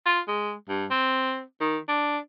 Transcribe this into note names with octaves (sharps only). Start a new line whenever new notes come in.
F4
G#3
G2
C4
D#3
D4